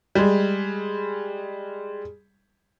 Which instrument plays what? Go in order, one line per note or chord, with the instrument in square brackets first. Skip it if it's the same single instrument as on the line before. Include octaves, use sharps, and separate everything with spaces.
[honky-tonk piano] G3 G#3